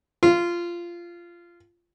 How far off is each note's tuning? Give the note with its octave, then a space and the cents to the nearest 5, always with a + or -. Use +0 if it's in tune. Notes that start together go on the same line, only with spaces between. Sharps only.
F4 -15